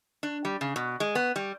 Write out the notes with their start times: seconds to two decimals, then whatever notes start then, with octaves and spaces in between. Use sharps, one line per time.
0.23 D4
0.45 G3
0.61 C#3
0.76 B2
1.00 G#3
1.15 B3
1.36 G3